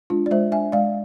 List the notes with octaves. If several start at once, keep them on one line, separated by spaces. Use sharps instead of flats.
G#3 D4 F4
D5
G#3 C5 E5
D4 E5 G#5
G#3 D5 F5